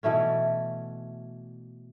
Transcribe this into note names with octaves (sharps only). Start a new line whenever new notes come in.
B2 E3 A3 C#4